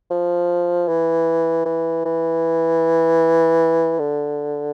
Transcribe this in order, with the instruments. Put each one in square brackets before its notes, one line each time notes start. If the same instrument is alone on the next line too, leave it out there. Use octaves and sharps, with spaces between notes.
[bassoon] F3
E3
E3
E3
D3